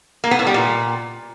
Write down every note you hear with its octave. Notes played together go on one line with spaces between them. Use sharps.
A#3
B3
A2
G3
A#2